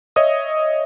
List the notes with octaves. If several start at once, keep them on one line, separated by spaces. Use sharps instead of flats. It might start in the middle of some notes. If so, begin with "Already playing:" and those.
C#5 D#5 E5 D#6